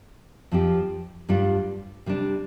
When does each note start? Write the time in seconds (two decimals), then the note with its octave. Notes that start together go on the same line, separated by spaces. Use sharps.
0.52 F2 F3 C4 G4
1.29 G2 G3 D4 F4
2.06 C3 G3 D4